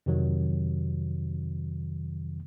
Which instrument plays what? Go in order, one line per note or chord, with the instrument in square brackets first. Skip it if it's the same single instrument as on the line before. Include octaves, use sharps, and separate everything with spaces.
[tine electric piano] F2 C3 D#3 F#3